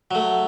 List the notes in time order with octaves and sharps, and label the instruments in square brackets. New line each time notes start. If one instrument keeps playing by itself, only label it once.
[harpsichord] F#3 A3